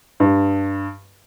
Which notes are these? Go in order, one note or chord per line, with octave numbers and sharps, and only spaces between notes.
G2